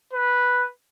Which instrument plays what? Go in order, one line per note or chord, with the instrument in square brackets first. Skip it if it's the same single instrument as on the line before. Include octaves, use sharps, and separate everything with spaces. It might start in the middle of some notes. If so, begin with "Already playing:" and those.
[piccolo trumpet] B4